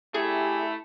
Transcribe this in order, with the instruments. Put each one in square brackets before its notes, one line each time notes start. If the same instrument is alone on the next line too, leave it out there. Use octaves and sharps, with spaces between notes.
[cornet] A3 [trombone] E4 [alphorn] G4 [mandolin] G#4